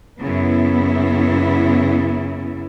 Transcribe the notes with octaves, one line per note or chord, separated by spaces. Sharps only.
F#2 C#3 B3 E4